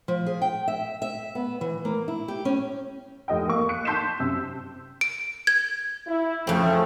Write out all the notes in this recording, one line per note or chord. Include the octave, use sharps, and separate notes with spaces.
F3
G#4
G5
E5
E5
B3
E3
A#3
E4
G4
C#4
F1 D#5 G5
A#3 C#6
F#6 C#7
A5 C6 G6 B6 C7 E7
F#2 C3 E6
D7
G#6
E4
F2 C#3 A3 C4